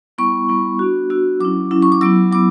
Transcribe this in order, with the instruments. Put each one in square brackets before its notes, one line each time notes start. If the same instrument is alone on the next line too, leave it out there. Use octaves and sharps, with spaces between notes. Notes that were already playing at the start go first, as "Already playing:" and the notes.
[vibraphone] G3 B3 E4 C#6
G3 B3 E4
B3 D4 F#4
B3 D4 F#4 E6
F#3 C#4 E4 D6
F#3 C#4 E4
C#6
D6
F#3 B3 E4 E6
F#3 B3 D6